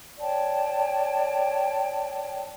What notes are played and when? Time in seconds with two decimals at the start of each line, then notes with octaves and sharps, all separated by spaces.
0.19 C#5 D5 G5 A5